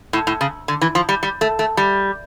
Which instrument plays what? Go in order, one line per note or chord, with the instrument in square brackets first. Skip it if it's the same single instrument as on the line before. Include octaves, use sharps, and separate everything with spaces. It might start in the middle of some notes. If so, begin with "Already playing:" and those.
[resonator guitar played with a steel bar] A2
A2
C#3
D3
E3
F3
G3
G3
A3
A3
G3